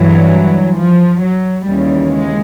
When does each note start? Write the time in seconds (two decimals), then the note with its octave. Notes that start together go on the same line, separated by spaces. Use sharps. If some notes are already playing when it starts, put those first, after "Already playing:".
Already playing: G2 E3 F#3
0.78 F3
1.23 F#3
1.67 D#2 C#3 E3 G3
2.12 G#3